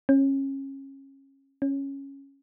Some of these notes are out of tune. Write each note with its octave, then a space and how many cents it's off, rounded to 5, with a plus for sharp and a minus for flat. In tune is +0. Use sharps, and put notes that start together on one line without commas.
C#4 -25
C#4 -10